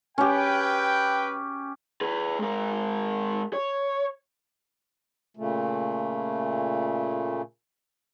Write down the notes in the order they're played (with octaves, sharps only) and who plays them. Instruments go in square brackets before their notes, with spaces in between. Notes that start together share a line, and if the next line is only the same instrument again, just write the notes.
[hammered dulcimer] C#4 G4 [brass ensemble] B4 G5
[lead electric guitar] G#4 B4
G#3 A#4
C#5
[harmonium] A#2 C#3 A3